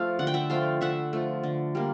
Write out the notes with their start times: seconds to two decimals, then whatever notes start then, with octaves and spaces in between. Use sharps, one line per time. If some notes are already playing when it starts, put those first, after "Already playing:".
Already playing: F3 A3 F5
0.19 D3 F#5
0.27 G5
0.34 E5 F#5
0.50 F3 A3 F5 G5
0.81 D3 E5 F#5
1.13 F3 A3
1.43 D3
1.75 G3 A#3